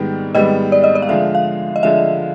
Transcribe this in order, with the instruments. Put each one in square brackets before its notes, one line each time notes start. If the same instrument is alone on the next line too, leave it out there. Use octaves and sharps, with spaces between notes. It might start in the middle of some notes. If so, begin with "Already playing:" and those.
Already playing: [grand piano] G#2 D#3 G3 B3
[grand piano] G#2 D#3 G3 B3 [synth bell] D#5
[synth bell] D5
D#5
D5
F5
[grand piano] D3 F3 G#3 [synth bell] E5
[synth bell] F5
D#5
[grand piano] D3 F3 G#3 [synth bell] E5